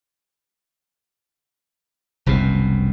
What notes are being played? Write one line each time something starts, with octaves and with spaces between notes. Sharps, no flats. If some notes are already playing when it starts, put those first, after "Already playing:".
F1 C2 F#2 B2